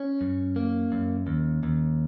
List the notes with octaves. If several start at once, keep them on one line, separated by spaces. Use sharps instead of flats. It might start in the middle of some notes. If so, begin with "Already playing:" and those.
Already playing: C#4
F#2
A#3
F#2
D#2
D#2